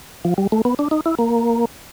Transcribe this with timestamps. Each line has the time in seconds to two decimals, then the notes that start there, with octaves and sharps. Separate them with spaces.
0.25 F3
0.38 G3
0.52 A3
0.65 B3
0.79 D4
0.91 D#4
1.06 E4
1.19 A#3